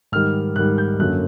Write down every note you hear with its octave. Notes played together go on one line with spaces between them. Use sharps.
G#2 D#3 G3 F6
G#2 D#3 G3 F#6
G6
F#2 D3 F#3 A#3 F#6